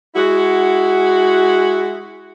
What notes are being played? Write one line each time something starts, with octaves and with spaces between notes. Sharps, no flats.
G#3 E4 F#4